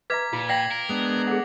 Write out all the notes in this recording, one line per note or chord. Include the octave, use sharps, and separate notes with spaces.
B4 E5 A#5 D6 G#6 B6
A#2 F4
D5 F5 G5 A#6 C7 F#7
A#4
G#3 B3 D4 F7
G#4 A4 F#5